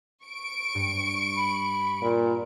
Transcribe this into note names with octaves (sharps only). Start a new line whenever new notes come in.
C#6 D7
G2
B5
A#2